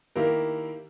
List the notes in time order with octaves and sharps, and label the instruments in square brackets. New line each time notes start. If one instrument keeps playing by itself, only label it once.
[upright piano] D#3 A#3 E4 G4 A#4